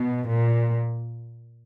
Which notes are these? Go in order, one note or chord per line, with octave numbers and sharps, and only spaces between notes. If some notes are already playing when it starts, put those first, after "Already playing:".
Already playing: B2
A#2